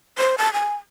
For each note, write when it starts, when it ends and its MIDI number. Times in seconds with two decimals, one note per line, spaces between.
0.18 0.36 72
0.38 0.52 81
0.53 0.75 80